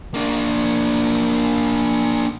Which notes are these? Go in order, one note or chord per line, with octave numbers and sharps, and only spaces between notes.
A#3 D4